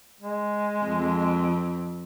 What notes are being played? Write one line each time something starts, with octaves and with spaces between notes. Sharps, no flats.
G#3
F2